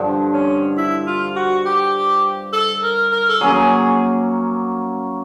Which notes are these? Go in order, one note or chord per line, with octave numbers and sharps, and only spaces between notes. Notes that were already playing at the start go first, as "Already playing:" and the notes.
Already playing: G2 D3 F3
C#4
E4
F4
F#4
G4
A4
A#4
A#4
A4
F#3 A#3 C#4 G#4